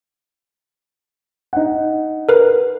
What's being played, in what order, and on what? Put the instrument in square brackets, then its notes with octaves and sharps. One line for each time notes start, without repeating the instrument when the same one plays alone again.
[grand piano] D#4 F#5
[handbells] A#4 B4